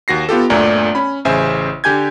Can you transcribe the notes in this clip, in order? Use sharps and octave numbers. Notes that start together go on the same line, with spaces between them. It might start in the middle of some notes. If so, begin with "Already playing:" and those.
D#2 F#4 A#6 C7
B3 F4 G4 A4
G1 D2 A#2 A3 D5 A#5
C#4 B5
A1 C#3 C5 E5 G#5
D3 G4 G#5 G6 G#6